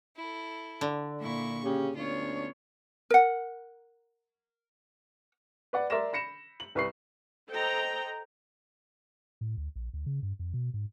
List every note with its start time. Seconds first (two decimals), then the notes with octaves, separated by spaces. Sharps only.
0.16 E4 A4
0.81 D3
1.21 A#2 E4 C#6
1.64 C#3 C#4 G4
1.96 D2 B3 C#4 D4 F4 C#5
3.10 A#4 F#5
5.73 B4 D5 F#5
5.90 A#4 D5 E5 C6 A#6 E7
6.13 B5 A#6 C#7 E7
6.60 F#7
6.75 C2 B4 C#6 C7
7.50 A4 C5 D#5 G5 A#5
9.41 A2
9.57 D2
9.76 A#1
9.94 D2
10.06 C#3
10.23 G2
10.39 F2
10.54 B2
10.74 G#2